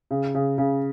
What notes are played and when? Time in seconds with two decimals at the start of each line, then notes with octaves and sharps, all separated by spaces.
0.11 C#3
0.35 C#3
0.58 C#3